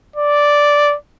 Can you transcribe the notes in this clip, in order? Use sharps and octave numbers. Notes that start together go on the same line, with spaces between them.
D5